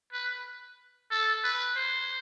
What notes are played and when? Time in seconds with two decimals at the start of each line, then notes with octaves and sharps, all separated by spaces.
0.13 B4
1.11 A4
1.44 B4
1.76 C5